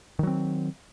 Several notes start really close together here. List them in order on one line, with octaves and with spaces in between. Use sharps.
D#3 F#3 C4